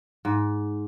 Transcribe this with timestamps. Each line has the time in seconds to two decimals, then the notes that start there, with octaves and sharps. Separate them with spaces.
0.25 G#2